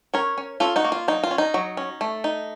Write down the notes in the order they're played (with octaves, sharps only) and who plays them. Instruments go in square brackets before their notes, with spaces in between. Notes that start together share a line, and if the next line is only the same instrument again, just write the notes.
[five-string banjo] C#4 A#4 C#5
C#4
C#4 F4 A4
D#4 F#4
A#3
F4
F#3 D#4
F4
C#4
D#4
F#3
C#4
A3
D#4